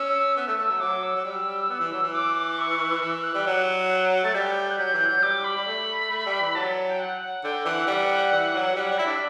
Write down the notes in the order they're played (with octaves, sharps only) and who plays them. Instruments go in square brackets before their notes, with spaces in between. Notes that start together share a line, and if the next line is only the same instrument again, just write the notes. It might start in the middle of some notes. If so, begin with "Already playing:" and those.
Already playing: [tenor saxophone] C#4 [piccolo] E6
[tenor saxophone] B3 [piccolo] E6
[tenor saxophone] A3
[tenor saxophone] A3 [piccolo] E6
[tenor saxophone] F#3
[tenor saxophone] F#3 [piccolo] D6
[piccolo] E6
[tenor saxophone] F#3
G3
B3
E3
F#3
E3
[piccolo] D6
D6
C#6
C#6
[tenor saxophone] E3 [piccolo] E6
[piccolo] F#6
[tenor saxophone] G3
F#3
[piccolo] F#6
[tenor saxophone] A3 [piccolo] A6
[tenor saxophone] G3 [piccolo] G6
[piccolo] G6
F#6
[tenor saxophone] F#3 [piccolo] G6
[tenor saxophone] E3
[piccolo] G6
[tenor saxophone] F#3
[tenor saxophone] G3 [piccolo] D6
[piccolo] B5
[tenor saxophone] G3
A3
A3
G3
E3
[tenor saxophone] F#3 [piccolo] A5
[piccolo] G5
F#5
F#5
[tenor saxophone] D3 [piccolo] G5
[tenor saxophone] E3 [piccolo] F#5
[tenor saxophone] G3
E3
F#3
[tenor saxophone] G3 [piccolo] F#5
[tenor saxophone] G3
[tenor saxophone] E4 [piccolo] B5
[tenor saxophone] D4